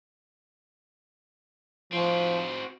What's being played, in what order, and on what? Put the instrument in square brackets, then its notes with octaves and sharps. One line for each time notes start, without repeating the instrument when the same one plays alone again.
[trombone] F3 [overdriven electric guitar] C4 F#4